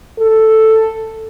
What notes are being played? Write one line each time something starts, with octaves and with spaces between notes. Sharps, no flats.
A4